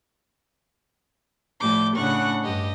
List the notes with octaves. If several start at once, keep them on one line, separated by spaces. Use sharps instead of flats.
A2 F3 G3 A3 D6 G6
A2 C#3 D4 F#5 C#6 F#6
G2 G4 D#5